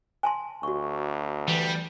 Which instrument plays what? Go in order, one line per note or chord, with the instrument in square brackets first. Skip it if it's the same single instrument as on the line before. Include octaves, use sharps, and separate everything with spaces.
[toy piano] G#5 A5 C6
[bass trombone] D2 [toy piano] F#4 C#6
[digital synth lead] E3 [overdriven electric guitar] G3